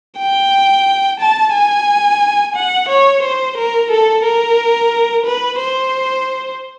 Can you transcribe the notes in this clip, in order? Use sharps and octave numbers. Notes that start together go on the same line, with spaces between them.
G5
A5
G#5
F#5
C#5
C5
A#4
A4
A#4
B4
C5